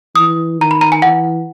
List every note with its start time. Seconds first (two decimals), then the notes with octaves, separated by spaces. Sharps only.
0.15 E3 D#6
0.59 D#3 A#5
0.71 B5
0.81 A#5
0.92 G#5
1.02 E3 F#5